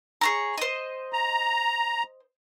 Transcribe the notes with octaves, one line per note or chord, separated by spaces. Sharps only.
G#4 C#5 A#5
C5 D#5
A#5